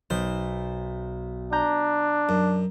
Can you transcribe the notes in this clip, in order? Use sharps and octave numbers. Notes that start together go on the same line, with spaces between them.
B1 C5
D4 A#5 G6
F#2